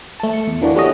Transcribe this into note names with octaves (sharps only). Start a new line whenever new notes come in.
A3 A5
C#7
E2
D3 E3 A#3 D4 F#4
G3 A3 C#4 F#4 D#5